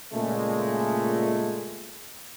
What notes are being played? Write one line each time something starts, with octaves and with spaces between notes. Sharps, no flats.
A#2 C#3 G#3 A3